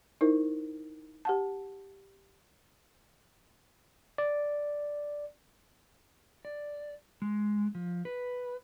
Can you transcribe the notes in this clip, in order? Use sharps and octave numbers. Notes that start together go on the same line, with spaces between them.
D#4 E4 A#4 C5
G4 F#5 A5
D5
D5
G#3
F3
B4